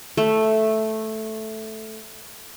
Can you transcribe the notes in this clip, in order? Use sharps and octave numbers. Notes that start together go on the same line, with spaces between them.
A3